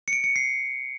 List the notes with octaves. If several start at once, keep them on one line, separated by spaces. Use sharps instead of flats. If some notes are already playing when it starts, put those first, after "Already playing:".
C#7
D7
C#7
C7